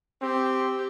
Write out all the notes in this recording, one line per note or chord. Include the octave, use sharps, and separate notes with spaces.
C4 G4